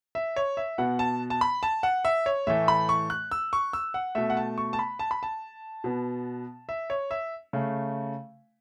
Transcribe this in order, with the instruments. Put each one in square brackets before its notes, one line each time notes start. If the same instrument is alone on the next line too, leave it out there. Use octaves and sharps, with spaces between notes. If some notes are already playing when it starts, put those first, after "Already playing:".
[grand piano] E5
C#5
E5
B2 B3 F#5
A5
A5
B5
A5
F#5
E5
C#5
A2 E3 A3 E5
B5
C#6
F#6
E6
C#6
E6
F#5
B2 A3 E5
F#5
A5
C#6
A5
B5
A5
B5
A5
B2 B3
E5
C#5
E5
C#3 A3